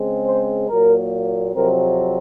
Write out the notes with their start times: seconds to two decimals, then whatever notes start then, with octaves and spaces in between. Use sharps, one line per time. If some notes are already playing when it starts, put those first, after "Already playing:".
Already playing: C#3 G#3 C4
0.26 C5
0.68 A#2 F#3 A#3 A#4
1.55 F2 C3 F#3 C4 A#4